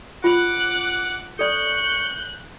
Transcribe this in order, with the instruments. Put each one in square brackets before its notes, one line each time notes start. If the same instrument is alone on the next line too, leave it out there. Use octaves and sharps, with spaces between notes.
[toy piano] F4 [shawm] F#5 [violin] D6 F#6
[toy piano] A4 D5 [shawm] C#6 [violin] F#6 G6